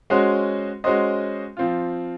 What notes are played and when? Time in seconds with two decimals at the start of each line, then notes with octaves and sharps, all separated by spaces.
0.10 G#3 C#4 F#4 C5 D#5
0.84 G#3 C#4 F#4 C5 D#5
1.57 F3 C4 F4